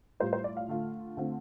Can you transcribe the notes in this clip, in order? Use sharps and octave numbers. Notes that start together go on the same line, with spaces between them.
A2 G3 F4 C5
C5
D5
F5
D3 A3 F4
D3 A3 C4 F4